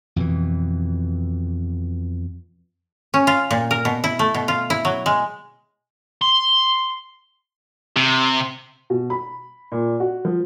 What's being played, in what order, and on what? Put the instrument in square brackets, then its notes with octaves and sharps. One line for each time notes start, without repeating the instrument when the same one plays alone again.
[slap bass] F2 B2 E3
[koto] C#4
F4
A#2
A#4
B2
E4
A3
B2
F4
E4
F#3
G#3
[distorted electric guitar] C6
C3
[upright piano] B2
B5
A#2
F#4
F3